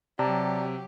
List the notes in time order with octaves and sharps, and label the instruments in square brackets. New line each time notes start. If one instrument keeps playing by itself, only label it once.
[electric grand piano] C3 [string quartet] F#3 G4 [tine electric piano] D5 A5 A#5